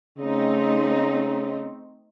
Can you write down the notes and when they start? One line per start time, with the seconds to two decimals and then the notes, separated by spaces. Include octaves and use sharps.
0.19 C#3 A3 C4 D#4